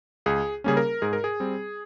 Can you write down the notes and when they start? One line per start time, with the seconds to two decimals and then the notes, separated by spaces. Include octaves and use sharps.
0.26 C#2 G#4
0.64 C#3 G3 A#3 C#4 G#4
0.77 A#4
1.02 G#2 G#4
1.13 A#4
1.24 G#4
1.40 G3 C4